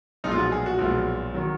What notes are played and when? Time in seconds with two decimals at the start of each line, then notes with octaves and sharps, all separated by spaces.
0.24 B1 A#2 F3 G#3 D#4
0.32 F4
0.38 F#4
0.52 G#4
0.66 F#4
0.79 B1 A#2 F3 G#3
1.34 D#3 F#3